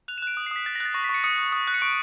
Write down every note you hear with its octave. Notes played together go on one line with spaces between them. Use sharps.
F#6 F7
E7
F#6 D7
D#6
C7
D#6 B6
F#6 A6
A#6
F#6 A6
C#6 A#6
B6
C#6 C#7
D#6 C#7
D#6
D#6
F#6
C#7
C#6 D7